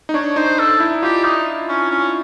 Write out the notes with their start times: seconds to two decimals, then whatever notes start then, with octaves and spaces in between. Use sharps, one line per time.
0.09 D#4
0.14 D4 C#5
0.36 D#4 C5
0.59 A4
0.80 E4
1.03 F4 G4
1.24 D#4
1.69 C#4
1.91 C#4